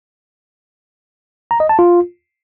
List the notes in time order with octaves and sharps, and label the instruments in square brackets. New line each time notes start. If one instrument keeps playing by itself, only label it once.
[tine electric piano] A#5
D#5
A5
F4